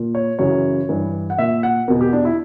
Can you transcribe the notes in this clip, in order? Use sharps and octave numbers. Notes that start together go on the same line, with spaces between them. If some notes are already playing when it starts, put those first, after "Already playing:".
Already playing: A#2
C#5
F#2 C#3 E3 C#5
G2 E3
F#5
A#2 E5
F#5
E2 B2 A#4
G4
D4
E4